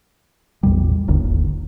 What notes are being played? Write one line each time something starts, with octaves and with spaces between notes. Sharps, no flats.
A1 E2 B2 G3
D1 G1 D#2 D3